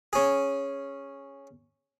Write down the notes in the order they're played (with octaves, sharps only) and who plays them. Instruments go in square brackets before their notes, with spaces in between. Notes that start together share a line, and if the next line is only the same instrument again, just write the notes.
[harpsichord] C#4 G#4